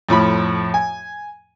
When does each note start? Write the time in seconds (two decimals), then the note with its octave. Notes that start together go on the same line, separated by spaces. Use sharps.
0.09 F2 A2 F3 B5
0.74 G#5